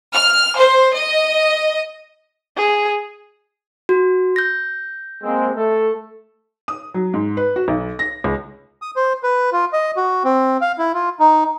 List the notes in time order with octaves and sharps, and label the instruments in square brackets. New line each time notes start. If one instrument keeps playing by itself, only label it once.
[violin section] F6
C5
D#5
[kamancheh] G#4
[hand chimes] F#4
G6 A#6
[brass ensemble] G#3 A#3 C4
A3 A4
[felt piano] D#6
F#3
G#2
B4
F#4
B1
A#6
C#2
[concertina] D#6
C5
B4
F4
D#5
F#4
C4
F5
E4
F4
D#4